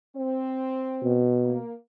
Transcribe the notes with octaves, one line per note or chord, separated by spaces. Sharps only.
C4
B2
A#3